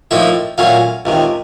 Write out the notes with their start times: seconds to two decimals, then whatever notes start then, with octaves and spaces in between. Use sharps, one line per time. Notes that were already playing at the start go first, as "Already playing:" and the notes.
0.11 A2 F3 A#3 D#4 E5
0.58 A#2 F#3 A3 C#4 F5
1.05 C#2 C3 D#3